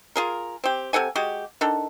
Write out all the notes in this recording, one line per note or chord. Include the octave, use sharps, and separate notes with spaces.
F4 G#4 A#4
C4 G4
C3 A4 F#5 G#5
G#3 F#4 G4
D#3 D4 A4